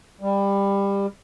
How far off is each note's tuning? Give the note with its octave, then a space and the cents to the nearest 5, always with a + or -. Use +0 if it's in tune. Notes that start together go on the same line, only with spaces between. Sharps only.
G3 +20